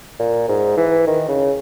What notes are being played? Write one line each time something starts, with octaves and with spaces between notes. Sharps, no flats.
A#2
G#2
E3
D#3
C#3